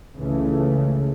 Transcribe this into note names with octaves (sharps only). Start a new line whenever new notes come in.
C#2 C#3 E3 A3